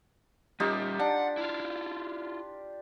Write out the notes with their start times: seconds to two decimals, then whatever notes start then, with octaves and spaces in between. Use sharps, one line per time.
0.60 G3 C#4 D#4 F4 G4
1.00 D4 F#5
1.37 E4 F4